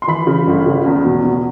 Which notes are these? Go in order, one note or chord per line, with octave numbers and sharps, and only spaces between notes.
C6
E3 B5
C#3
G1
C#3
E2
B2
B2